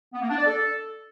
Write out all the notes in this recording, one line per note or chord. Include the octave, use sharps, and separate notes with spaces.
B3
A#3
D4
D5
A4